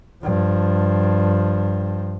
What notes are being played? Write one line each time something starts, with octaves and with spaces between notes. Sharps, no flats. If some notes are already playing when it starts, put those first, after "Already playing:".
G2 F3